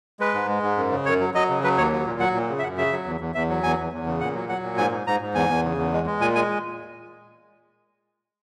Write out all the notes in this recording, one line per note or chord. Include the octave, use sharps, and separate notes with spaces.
G#3 B4
G#2
G#3
G#2
F#2
C#3
F#2 C#5
F#3
F#3 D#5
C#3
F#3 B4
D#2 C#5
F#3
A#2
F#3 F#5
A#2
C#3
E5
F#2 F#5
C#3 E5
F#3
E2
E2
E2 E5
F#3
E2 G#5
E2
E2
C#3
A#2 F#5
F#3
F#3 F#5
A#2
G#2 G#5
G#2
G#2 A#5
G#2
E2 G#5
E2
C#3
E2
G#3
G#3
A#2 G#5
G#3 G#5